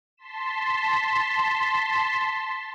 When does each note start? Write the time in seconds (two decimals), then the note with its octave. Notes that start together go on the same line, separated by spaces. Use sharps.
0.17 A5 C6 B6 E7